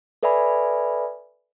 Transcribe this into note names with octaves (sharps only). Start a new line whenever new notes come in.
A4 B4 D5 E5 G#5 B5